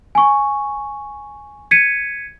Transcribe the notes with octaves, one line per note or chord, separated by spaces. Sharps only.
G#5 C#6
G#6 B6 C#7 D#7